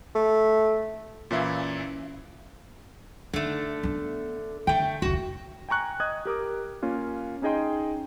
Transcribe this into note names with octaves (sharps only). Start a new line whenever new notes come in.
A3
A#2 E3 C#4 E4 E5 F5
D3 A3 D#4
B3 D4
D3 A3 G5
F1 C#2 F#4
G5 G#5 A#5 C#6 F#6
D#5 D#6 F#6 G#6
G4 A#4 D6 D#6
A#3 C#4 F4
C#4 D#4 G#4 D#5 G5 C6